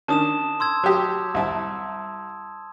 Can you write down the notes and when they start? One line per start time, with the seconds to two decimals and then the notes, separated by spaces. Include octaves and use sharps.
0.08 D#3 C#4 D4 A5 D#6 E7
0.60 C6 E6 G#6
0.84 F#3 G4 D#6
1.34 C2 E4 A5